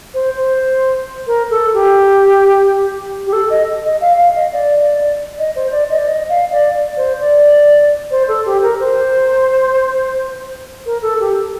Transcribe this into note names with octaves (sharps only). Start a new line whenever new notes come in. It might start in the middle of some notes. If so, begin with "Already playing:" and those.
C5
C5
A#4
A4
G4
G4
A4
D#5
D#5
F5
F5
D#5
D5
D#5
C5
D5
D#5
D5
D#5
F5
D5
C5
D5
C5
A4
G4
A#4
C5
A#4
A4
G4